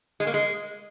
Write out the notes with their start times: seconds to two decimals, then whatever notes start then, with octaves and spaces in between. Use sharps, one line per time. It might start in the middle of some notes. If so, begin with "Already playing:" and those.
0.20 G#3
0.27 A#3
0.34 G#3